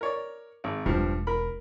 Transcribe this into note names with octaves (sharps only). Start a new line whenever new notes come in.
A#4 C#5 D5
G#1
E1 G2 F3
A#4 B5